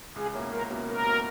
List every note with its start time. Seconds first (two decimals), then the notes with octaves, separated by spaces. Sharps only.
0.16 C#2 G#4
0.34 B2 A#3 C#4 E4
0.52 C#2 A#4
0.70 B2 A#3 C#4 E4
0.87 C#2 A#4
1.06 B2 A#3 C#4 E4